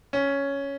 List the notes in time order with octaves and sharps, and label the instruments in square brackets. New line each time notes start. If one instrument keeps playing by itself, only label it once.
[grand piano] C#4